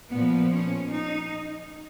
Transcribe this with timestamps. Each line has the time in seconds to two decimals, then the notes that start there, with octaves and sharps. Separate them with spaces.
0.12 A#2 F3 B3
0.52 C#4
0.91 D#4